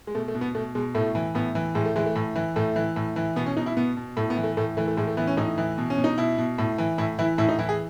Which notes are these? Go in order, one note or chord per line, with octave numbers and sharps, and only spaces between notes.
G#3
B2 A3
A3
B2
B3
B2 A3
B2 G#3
A2 A3
E3
A2 B3
E3
A2 G#3
A3
E3 G#3
A3
A2
E3
A2 A3
E3
A2
E3
B2 B3
C#4
B2 D#4
E4
B2 B3
B2
A2 A3
B3
E3
A3
A2 A3
E3 A3
A3
A2 G#3
A3
E3 B3
C#4
A2 D#4
E3
B2
C#4
B2
D#4
B2 E4
B2
A2
E3
A2 E4
E3 E4
A2 E4
D#4
E3 E4
G#4